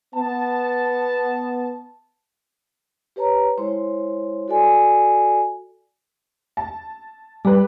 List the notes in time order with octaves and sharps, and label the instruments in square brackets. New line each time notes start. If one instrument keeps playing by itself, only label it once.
[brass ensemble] B3 A5
[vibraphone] G4 B4 C#5 A5 A#5
G#3 E4 C5 C#5 C6
F#4 A4 D5 G#5
[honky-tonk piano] A5
[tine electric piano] G3 [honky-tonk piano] G4 B4